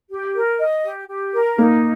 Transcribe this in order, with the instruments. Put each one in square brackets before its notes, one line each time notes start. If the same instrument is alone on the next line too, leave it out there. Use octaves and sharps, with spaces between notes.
[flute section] G4
A#4
D#5
G4
G4
A#4
[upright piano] A#3 [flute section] D#4